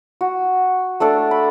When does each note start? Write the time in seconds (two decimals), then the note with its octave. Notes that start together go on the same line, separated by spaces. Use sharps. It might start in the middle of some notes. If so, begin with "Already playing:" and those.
0.21 F#4
1.00 A3 D4 A4 D5
1.31 B5